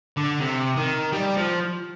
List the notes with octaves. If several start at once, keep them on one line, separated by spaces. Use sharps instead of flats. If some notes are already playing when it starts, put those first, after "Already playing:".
D3
C3
D#3
G3
F3